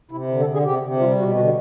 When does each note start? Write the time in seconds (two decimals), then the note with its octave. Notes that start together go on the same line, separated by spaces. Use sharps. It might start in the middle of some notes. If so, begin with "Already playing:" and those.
0.11 C3 E4
0.28 D3
0.40 A4
0.47 D3
0.53 G#4
0.64 C3 G4
0.83 C3
1.00 G3 F4
1.18 B2 F#4
1.35 D3 F#4